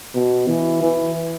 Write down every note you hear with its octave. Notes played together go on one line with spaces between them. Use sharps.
B2
E3
E3